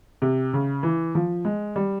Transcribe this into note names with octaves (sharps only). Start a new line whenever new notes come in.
C3
C#3
E3
F3
G#3
G3